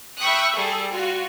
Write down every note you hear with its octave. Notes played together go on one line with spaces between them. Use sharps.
E5 G5 B5 C#6 D#6 F#6
G3 G#4 A4
F4 F#4